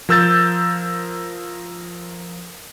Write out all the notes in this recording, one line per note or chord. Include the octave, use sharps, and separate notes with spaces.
F3 A#4 E6 G6 A6